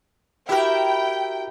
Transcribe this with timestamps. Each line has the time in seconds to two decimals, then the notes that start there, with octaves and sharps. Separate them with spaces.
0.49 E4 F#4 G4 A#4 E5 G5